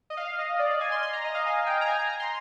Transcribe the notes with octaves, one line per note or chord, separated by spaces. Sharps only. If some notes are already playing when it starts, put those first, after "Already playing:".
D#5
F5
D#5
D5
D5
G#5
C6
C6
A#5
D#5
F5
G#5
G5
A#5
G#5
A#5
A#5
C6